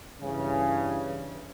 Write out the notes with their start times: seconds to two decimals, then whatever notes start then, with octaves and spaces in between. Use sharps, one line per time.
0.21 G2 C#3 E3